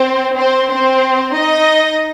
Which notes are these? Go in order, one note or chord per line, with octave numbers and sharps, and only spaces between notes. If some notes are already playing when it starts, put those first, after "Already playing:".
Already playing: C4 C5
C4 C5
C4 C5
D#4 D#5